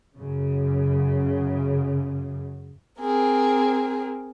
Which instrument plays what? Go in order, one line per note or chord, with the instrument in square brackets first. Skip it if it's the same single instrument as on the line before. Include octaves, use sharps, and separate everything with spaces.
[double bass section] F#2 C#3
[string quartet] C4 G#4 A#4